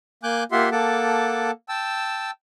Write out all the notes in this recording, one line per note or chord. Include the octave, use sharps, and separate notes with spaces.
A#3 G#5 D6 F#6 G6
A#3 F4 G4 E5 F#5 C6
A#3 A4 F#5 A5 D6
G5 A5 E6